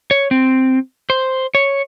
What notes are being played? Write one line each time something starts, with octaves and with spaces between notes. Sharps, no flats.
C#5
C4
C5
C#5